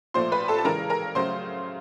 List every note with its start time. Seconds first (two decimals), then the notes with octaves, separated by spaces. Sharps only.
0.14 A#2 F3 A3 C5 C6
0.32 B4 B5
0.48 A4 A5
0.58 A5
0.65 C#3 E3 G#3 A#4 A#5
0.90 A#4 A#5
1.15 C#3 F#3 A3 C5 C6